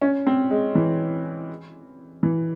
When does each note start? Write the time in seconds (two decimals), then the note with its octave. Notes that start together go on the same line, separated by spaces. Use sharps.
0.01 C#4
0.27 C4
0.51 G#3
0.75 E3
2.23 E3